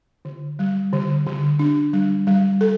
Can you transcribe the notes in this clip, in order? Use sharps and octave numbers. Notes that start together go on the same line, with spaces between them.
D3
G3
D3
D3
D4
G3
G3
A4